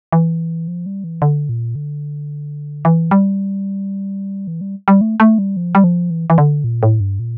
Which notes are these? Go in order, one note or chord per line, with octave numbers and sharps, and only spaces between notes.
E3
F3
G3
E3
D3
A#2
D3
E3
G3
E3
G3
G3
A3
A3
G3
F3
G3
F3
E3
E3
D3
A#2
A2
G2
A#2